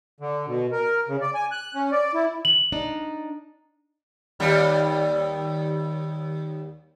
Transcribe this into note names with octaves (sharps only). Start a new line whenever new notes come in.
D3
B2
A#4
C#3
D5
G#5
F#6
C#4
D5
E4
F#7
D4 D#4
D#2 G3